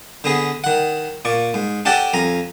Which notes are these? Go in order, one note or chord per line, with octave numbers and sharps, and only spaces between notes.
D3 B3 G#4
D#3 F#5
A#2 D5 C#6
G#2
C#4 G4 A4 D5 F#5 A5
F2 G#5 A#5